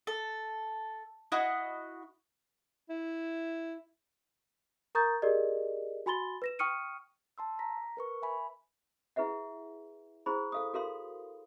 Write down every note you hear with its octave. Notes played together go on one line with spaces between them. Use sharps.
A4
E4 F#4 D#5 F#6
E4
A#4 A#5 C#6 D#6 G6 A6
G4 G#4 A#4 D5 D#5
F#4 G#5 B5 C6 A6 G7
B4 A#6 E7
G5 C#6 D#6 F6 C#7 D#7
A5 C6 E6
A#5 A#6 B6
A#4 B4 C#6
E5 G#5 B5
E4 G#4 B4 E5 F#5
E4 G#4 C5 B5
A4 F5 D#6
F#4 A4 A#4 F5 C6